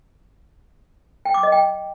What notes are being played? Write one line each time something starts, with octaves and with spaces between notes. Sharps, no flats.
G5
D6
D#5
G5